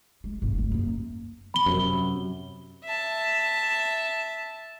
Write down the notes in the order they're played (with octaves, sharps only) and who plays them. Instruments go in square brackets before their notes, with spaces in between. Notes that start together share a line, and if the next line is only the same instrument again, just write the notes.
[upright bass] G#3
G#1 B2
F#1 D2
F#2 A#3
[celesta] B5 G7
[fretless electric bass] F#2 C3
[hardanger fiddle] E5 A5